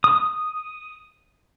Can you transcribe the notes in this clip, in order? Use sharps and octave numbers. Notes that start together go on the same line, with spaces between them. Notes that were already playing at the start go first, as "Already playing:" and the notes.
D#6